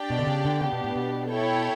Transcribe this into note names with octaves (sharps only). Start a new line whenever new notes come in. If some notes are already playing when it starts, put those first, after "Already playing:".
Already playing: D4 G4 D5 G5
B2
D3
C#3
D3
C#3 B3 D4 G4
B2
A2
B2
E4 A4 C#5 G5